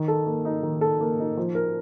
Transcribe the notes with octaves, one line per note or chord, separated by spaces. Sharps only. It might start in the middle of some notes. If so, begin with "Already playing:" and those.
Already playing: D#3
A4
A#3
D#4
D#3
A4
A#3
D#4
F3
A#4